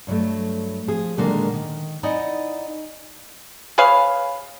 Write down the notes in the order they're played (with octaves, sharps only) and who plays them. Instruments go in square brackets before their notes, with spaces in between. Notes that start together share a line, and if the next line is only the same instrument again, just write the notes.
[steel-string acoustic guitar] G2 F#3 G3 A3
F3 G#4
A#2 D3 D#3 G#3 A#3
D#3
D#4 E4 D5 D#5 F#5 G#5
[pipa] G#4 B4 C#5 F5